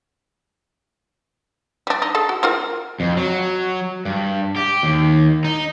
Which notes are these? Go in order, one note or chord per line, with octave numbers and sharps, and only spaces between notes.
G3 D4
D#4
G#4 A4 A5
F#4
C4 F4 A#4
F2
F#3
G2
G4
D#2
D#4